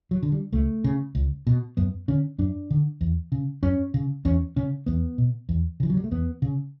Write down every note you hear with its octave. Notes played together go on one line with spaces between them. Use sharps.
F#3
D3
G3
C#2 A3
C#3
C#2
B2
F#2 B3
D3 C#4
F#2 D4
D3
E2
C#3
F#2 C#4
C#3
E2 C#4
C#3 C#4
E2 B3
B2
E2
C#3 E3
F#3
G3
A3
E2 B3
C#3